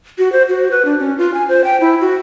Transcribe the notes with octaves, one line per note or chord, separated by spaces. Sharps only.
F#4
C5
F#4
B4
D4
C#4
F4
G#5
C5
G5
E4
F#4